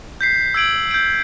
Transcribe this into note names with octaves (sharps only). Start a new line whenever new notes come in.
G6 B6 C7
E6 G#6 D7 F#7
G6 D7